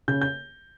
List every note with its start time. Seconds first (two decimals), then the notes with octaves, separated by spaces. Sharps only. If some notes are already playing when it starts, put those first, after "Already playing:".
0.08 C#3 G6
0.21 G6